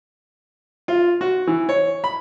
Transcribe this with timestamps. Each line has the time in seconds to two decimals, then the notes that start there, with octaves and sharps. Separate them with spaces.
0.88 F4
1.21 F#4
1.47 E3
1.69 C#5
2.04 B5